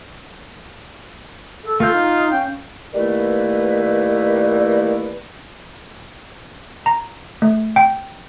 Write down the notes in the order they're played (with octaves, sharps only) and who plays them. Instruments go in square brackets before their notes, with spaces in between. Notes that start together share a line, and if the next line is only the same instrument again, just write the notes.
[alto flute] A4
[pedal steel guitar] A3 G6 [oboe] F4 [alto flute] A4
[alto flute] D#4 [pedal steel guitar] F5 F6
[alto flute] C#4 [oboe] G5
[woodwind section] D#3 G3 A3 A#3 E4 B4
[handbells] A#5
A3
G5